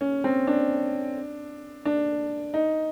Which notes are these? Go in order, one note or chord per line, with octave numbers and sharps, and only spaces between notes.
C#4
C4
D4
D4
D#4